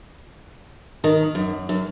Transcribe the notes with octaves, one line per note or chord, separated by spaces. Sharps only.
D#3
F#2
F#2